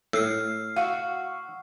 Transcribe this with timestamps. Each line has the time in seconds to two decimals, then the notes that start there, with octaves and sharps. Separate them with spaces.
0.13 A2 E6 F6 C7
0.76 F#4 F5